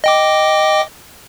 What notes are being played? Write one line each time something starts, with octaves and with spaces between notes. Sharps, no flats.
D#5 G5 D6